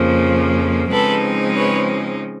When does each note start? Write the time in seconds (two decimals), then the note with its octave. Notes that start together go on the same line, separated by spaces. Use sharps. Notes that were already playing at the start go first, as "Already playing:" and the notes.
Already playing: F2 C#3 F3 A#3
0.91 C#3 F3 G#3 C4 D#4 A4 B4
1.56 B4 C#5